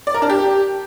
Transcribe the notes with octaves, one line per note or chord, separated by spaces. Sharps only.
D5
A#4
D4
G4